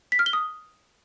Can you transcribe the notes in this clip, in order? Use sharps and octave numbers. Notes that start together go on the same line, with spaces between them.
B6
F6
G7
D#6